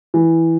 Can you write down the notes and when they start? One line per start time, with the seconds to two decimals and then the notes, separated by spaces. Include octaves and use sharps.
0.14 E3